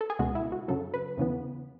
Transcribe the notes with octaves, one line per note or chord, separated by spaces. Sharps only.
A4
G#4
C#2 B2 G#3 F#4
E4
F#4
F#2 C#3 F#3 A4
B4
E2 C#3 E3 B3